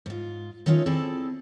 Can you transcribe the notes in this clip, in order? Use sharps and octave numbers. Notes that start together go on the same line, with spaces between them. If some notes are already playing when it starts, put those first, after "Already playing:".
G#2 F4
D#3 A3 C#4 D#4 F4 C#5
C4 E4 G#4 A4 D5 A5